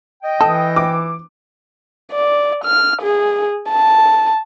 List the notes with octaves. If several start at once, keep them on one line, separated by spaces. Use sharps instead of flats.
D#5 G5
E3 A4 D#6
D6
D5
F6
G#4
A5